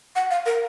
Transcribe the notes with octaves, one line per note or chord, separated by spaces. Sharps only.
F#5
F5
A#4